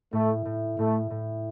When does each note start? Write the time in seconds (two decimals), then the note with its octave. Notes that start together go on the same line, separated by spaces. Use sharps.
0.12 A2 A3
0.45 A2
0.78 A2 A3
1.11 A2